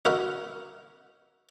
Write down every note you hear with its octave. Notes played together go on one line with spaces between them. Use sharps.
D#4 F#4 A#4 E5